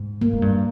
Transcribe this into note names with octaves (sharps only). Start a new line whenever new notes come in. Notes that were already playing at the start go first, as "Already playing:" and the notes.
Already playing: G#2
A#3
G#2
G2